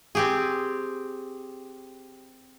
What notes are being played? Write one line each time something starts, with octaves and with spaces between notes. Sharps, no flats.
C4 G4 G#4